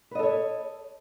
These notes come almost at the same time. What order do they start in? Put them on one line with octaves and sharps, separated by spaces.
B4 D#5 A4 C#5